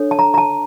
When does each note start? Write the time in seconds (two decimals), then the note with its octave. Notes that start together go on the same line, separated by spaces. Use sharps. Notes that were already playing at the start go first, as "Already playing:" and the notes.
Already playing: D4 A4 C#5
0.11 A5
0.19 A#5
0.34 A#5
0.38 A5